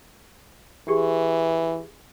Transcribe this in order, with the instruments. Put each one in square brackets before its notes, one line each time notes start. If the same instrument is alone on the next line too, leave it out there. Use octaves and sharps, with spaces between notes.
[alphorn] E3 [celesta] G4 G#4 C#6